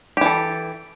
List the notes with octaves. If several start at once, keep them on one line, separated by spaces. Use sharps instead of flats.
E3 G4 A4